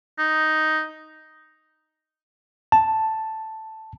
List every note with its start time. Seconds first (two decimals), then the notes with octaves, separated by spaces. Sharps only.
0.19 D#4
2.72 A5